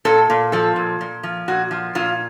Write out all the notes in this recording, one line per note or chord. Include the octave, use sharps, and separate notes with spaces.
A#2 A4
A#2
F3 A4
A#2
A#2
F3
A#2 F#4
F3
A#2 F4